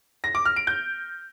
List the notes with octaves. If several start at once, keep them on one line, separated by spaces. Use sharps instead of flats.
A#6
D6
F6
D7
G6